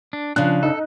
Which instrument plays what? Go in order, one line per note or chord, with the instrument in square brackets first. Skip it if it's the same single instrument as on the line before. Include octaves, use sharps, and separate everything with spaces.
[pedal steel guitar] D4
[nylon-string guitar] C#3 D4 [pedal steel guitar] F3 [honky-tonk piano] F#6
[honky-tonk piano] D#4 [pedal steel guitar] A4